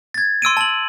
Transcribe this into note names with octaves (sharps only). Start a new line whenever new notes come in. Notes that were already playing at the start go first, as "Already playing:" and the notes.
G#6 A6
C6 E6 D7 D#7
A5 F#7